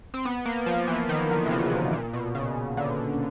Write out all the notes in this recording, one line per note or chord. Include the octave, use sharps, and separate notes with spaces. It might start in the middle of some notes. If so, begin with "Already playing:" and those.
C4
B3
A#3
F3
E3
D#3
D3
C3
C#3
C3
B2
A#2
B2
C#3
D3